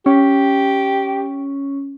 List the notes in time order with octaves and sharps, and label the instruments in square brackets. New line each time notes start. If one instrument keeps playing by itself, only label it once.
[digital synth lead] C#4 [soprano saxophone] G4